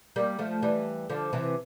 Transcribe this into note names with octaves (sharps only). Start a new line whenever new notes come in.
G3 A#3
F3 A3
E3 G3
D3 F3
C3 E3